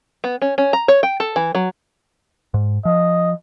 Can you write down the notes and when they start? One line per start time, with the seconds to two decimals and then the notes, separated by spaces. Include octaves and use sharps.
0.24 B3
0.42 C#4
0.58 C#4
0.73 A#5
0.88 C#5
1.03 G5
1.20 A4
1.36 E3
1.55 F#3
2.54 G#2
2.85 F3 D#5